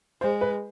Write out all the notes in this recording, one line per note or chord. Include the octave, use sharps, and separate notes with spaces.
G#3 C5
B4